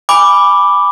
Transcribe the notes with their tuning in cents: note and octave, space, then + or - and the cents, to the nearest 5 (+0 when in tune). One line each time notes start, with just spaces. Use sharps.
G#5 -25 B5 +0 D6 +0